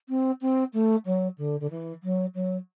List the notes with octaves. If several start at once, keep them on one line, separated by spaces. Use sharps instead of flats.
C4
C4
A3
F#3
D3
D3
E3
F#3
F#3